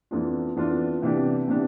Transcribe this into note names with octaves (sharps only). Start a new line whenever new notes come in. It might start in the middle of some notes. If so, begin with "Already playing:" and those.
F2 E3 B3 D4 F4
F2 E3 B3 D4 F4
C3 E3 B3 D4 G4
C3 E3 B3 D4 G4